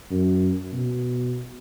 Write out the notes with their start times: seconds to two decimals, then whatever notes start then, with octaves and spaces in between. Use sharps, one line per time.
0.11 F#2
0.73 B2